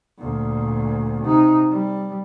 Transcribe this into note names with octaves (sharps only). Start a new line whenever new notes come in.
D2 A#2
C3 D#4
G3